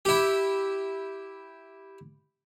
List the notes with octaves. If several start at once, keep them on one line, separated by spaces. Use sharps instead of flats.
E4 G4